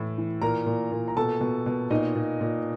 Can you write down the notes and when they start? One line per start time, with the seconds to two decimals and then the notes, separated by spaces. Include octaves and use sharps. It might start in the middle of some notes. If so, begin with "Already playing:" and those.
Already playing: A2 E3
0.18 E3
0.42 A#2 A#4 A#5
0.66 A#2
0.92 A#2
1.08 A#5
1.17 B2 A4 A5
1.41 B2
1.66 B2
1.90 A#2 D#4 D#5
2.15 A#2
2.41 A#2